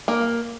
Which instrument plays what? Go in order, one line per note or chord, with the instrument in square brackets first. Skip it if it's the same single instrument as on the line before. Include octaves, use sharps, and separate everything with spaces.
[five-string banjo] A#3